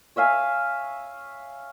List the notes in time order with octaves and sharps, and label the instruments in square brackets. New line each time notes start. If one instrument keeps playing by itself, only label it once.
[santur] C#5 E5 F5 G#5